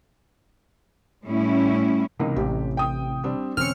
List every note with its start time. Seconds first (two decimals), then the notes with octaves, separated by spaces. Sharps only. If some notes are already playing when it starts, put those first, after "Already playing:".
1.25 A2 G3 C#4 E4
2.19 C#2 C3 E3 A#3 D#4
2.36 A1 G4
2.77 G5 D#6
3.24 G3 C4 D4
3.57 E1 D3 C4 C#4 F6 C#7